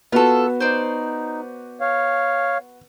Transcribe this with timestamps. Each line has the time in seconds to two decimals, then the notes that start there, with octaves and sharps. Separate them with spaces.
0.12 B3 F4 F#4 A4
0.60 D#4 C5 D5
1.81 C#5 F5